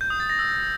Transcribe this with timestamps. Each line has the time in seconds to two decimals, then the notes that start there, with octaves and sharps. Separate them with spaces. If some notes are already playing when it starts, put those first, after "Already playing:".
0.01 G6
0.10 D#6
0.20 A6
0.30 A#6
0.39 E6